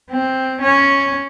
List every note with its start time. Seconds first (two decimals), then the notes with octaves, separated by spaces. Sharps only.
0.11 C4
0.62 C#4